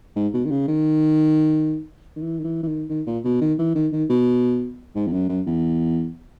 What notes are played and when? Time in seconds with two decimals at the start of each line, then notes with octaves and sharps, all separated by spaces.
0.16 G#2
0.34 B2
0.45 D#3
0.51 C#3
0.68 D#3
2.16 D#3
2.21 E3
2.38 D#3
2.44 E3
2.63 E3
2.67 D#3
2.89 D#3
3.06 A#2
3.24 B2
3.41 D#3
3.58 E3
3.75 D#3
3.92 D#3
4.09 B2
4.95 G#2
5.07 E2
5.12 F#2
5.29 F#2
5.46 E2